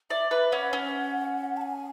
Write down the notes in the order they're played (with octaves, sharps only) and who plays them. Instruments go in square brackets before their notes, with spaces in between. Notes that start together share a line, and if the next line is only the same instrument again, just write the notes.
[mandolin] D5 [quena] E5
[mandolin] B4 [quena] E5
[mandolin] C#4 [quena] F#5
[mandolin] C#4
[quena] A5
G#5